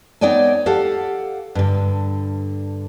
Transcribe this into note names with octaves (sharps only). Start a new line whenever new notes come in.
B3 D#4 C#5 D5 G5 G#5
G4 A4 F5 F#5
G2 D3